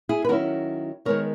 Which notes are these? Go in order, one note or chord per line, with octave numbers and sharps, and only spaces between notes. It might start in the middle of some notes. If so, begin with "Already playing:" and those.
E4 G#4
B4
D#3 F#3 C#4 E4 F#4 A#4
D#3 G#3 B3 A#4 C#5